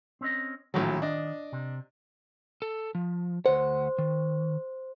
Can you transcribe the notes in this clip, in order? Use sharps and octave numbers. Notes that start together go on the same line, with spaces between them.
C4 C#4 D#5
A#1 A2 D#3 F#3
D4 D#5
C3
A4
F3
D2 C5 F#5
D#3